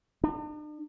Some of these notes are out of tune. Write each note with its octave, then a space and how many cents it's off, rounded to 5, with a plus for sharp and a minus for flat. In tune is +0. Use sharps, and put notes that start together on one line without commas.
D4 +45